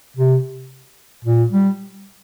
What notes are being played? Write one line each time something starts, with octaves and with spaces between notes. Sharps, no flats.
C3
A#2
G3